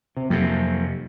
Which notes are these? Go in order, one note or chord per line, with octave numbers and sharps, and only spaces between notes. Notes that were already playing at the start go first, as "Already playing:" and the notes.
C3
F2 C3 F#3 A#3